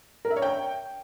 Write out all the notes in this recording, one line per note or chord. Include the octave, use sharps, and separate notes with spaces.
A#4
E5
C#5
G5